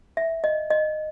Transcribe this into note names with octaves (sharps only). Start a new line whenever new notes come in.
E5
D#5
D#5